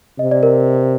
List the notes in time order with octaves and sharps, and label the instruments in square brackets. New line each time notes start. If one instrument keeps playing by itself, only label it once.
[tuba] C3 [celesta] D#5
[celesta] D5
A#4